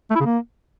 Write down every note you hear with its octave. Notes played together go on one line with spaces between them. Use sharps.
A3
E4
C#3
A#3